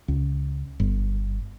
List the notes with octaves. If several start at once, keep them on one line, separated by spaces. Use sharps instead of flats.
C#2
G1